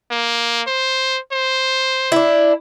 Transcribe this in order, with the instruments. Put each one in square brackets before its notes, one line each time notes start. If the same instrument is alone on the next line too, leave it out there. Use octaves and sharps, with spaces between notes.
[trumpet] A#3
C5
C5
[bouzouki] D4 E4